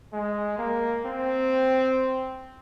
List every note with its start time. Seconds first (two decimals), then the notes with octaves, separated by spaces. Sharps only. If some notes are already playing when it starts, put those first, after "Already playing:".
0.13 G#3
0.58 A#3
1.06 C4